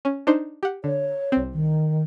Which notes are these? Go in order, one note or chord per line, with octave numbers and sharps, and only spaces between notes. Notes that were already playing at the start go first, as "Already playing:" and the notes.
C#4
D4 D#4 C5
G4 F#5
D3 C#5
C2 C4
D#3